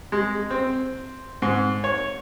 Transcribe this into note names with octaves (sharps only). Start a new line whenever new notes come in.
G#3
C4
G#2
C#5